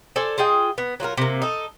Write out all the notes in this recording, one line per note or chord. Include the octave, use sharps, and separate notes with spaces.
A4 C5 D5 G#5
F4 G#4 D#5 G5
B3
F#3 F4 A4 A#4
C3 A#3
D#4 A4